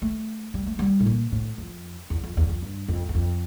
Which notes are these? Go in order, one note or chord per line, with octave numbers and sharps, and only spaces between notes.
A3
G3
A3
G3
A2
A#2
A2
F2
E2
F2
E2
F2
G2
F2
E2
F2